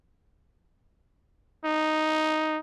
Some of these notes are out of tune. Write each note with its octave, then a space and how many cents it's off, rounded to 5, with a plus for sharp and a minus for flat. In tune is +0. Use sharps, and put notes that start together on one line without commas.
D#4 +0